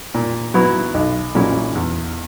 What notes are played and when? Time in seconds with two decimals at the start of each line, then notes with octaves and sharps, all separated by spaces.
0.15 A#2
0.54 F#3 B3 E4
0.94 B1
1.35 A#2 F#3 C#4 E4
1.75 E2